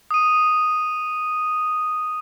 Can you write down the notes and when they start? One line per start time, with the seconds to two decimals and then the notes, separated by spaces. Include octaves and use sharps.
0.11 D#6 D#7